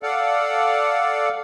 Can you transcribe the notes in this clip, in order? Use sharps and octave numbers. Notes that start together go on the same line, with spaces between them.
A4 D5 F5 F#5